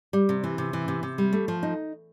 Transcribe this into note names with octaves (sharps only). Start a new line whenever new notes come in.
G3
C3
E3
C3
E3
C3
C3
G3
A3
F3
D#4